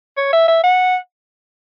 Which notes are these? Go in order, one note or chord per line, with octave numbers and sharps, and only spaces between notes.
C#5
E5
E5
F#5